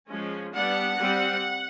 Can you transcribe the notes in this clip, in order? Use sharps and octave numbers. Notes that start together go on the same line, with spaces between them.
F3 G#3 C#4
G3 B3 D4 F#5
G3 C4